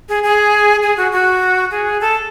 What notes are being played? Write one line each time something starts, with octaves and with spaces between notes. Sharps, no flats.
G#4
G#4
G#4
F#4
F#4
G#4
A4